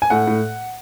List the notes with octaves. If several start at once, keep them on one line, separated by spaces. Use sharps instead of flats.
G#5
A2 F#5
A2